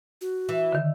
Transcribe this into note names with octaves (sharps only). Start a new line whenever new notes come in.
F#4
E3
D3 D#3